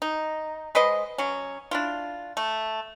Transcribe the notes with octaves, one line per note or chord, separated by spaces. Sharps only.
D#4
G#3 B4 C5 D#5
F#3 C#4
D4 E4 F4
A3